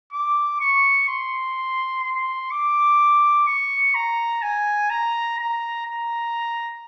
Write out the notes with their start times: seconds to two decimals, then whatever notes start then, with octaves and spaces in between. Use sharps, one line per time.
0.13 D6
0.60 C#6
1.09 C6
2.03 C6
2.51 D6
3.47 C#6
3.95 A#5
4.42 G#5
4.90 A#5
5.38 A#5
5.86 A#5